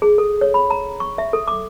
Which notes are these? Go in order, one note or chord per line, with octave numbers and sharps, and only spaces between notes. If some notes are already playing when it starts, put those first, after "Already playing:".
G#4
A4
C#5
B5
A#5
C#6
E5
A4
D6